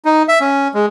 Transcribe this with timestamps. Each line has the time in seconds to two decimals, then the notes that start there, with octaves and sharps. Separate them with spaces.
0.05 D#4
0.28 E5
0.41 C#4
0.74 G#3